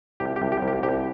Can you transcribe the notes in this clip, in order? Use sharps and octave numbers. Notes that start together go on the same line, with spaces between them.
C2 G4
G4
C2
G4
C2
G4
C2 G4